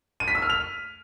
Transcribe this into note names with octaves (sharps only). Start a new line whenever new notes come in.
D#7
B6
E6
F6
F7